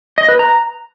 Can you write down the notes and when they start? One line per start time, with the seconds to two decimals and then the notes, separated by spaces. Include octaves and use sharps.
0.18 D#5
0.29 B4
0.39 A#5